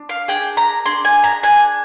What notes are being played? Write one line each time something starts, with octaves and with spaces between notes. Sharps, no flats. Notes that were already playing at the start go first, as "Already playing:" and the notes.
Already playing: D4
F5
D4 G#4 G5
A#5
D4 G#4 C6
G#5
A#5
D4 G#4 G#5